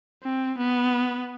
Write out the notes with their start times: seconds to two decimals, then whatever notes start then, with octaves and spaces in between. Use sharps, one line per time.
0.23 C4
0.58 B3